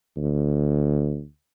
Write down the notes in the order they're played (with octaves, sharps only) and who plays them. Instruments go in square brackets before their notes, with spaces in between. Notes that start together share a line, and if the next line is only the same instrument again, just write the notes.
[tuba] D2